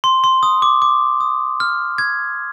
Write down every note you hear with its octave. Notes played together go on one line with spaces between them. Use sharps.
C6
C6
D#6
D6
D6
D#6
F6
G#6